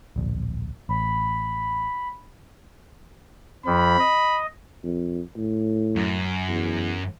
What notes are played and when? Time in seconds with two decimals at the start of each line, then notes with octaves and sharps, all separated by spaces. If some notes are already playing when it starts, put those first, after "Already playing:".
0.16 D1 A#1
0.89 A1 B5
3.66 F2 F3 B5
3.99 D#5
4.84 F2
5.37 A2
5.96 F#2
6.48 E2